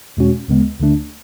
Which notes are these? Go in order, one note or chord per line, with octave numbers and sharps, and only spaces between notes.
E2 B2 G#3 C#4 F#4
D2 C#3 G#3 B3
D2 D3 A3 D4